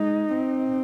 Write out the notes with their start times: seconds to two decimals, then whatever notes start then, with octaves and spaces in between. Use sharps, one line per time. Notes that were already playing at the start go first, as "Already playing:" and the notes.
Already playing: G#3 D#4
0.33 C4